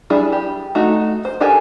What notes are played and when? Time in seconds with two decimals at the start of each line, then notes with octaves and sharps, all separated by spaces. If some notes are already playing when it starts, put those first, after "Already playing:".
0.10 G3 D4 E4 G#4
0.32 G4
0.75 A3 D#4 F#4
1.25 C5
1.40 F#4 G4 A4 A#4 G#5